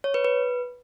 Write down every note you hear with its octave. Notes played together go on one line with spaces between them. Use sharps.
C#5
B4
B4